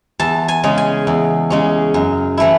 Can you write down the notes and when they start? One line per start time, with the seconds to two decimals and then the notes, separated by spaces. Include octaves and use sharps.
0.20 E2 A5
0.48 G#5
0.64 C#3 G#3 C#4
0.78 G#5
1.07 E2
1.50 C#3 G#3 C#4
1.94 F#2
2.37 E3 A3 E4